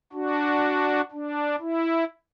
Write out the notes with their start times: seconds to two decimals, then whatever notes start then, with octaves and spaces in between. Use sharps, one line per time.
0.13 D4 F#4
1.11 D4
1.60 E4